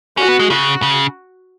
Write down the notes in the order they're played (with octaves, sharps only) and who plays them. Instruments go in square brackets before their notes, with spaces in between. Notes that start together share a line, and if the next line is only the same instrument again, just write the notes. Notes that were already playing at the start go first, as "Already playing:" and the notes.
[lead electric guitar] C#4 [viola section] F#4
[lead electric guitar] B3
G#3
[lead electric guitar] C#3 [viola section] F#4
[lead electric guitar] C#3